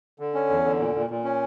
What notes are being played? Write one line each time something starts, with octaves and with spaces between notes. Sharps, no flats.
D3
C#4
E2
D3
A#2
A#2
A#2
C#4